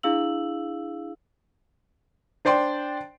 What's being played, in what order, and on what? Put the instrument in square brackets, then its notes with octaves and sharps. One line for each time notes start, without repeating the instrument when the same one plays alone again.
[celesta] D4 E4 G#4 F5 E6 F#7
[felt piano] D4 C5 D5 G5 C6